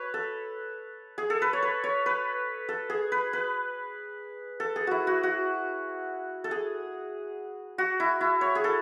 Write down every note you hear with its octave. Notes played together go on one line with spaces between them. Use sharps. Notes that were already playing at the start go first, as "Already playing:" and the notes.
Already playing: B4 C#5
A4
G#4
A4
B4
C#5
B4
C#5
B4
A4
G#4
B4
B4
A4
G#4
E4 F#4
F#4
F#4
A4
G#4
F#4
E4
E4
C#5
G#4
A4